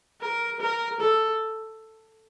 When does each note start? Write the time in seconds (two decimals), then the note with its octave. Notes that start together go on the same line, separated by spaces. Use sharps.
0.22 A#4
0.61 A#4
1.00 A4